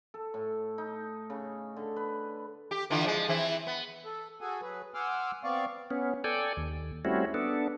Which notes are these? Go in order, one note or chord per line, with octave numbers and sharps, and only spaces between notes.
A4
A2
D#4
C#3
D3
B4
G4
D3 E3 F4
F3 G#3
E3 C4 E4
B3
A4
F#4 G#4 A4 G#5
F#3 G#4 B4
F#5 G#5 C6 D6 E6 F6
B3 C4 D5 F5 C#6
B3 C#4
A4 D5 G5 G#5
D#2
G3 A3 C4 C#4 E4 F#4
B3 D4 A4